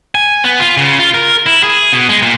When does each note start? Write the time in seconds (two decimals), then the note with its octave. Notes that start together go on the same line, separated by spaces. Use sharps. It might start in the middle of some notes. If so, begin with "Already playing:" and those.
0.15 G#5
0.44 B3
0.60 F4
0.77 C#3
0.99 F4
1.14 A#4
1.46 E4
1.63 G#4
1.93 B2
2.09 G#3
2.22 A#2